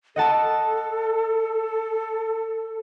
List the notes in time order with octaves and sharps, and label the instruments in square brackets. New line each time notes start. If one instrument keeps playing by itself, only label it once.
[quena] A4 [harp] D#5 F#5 A5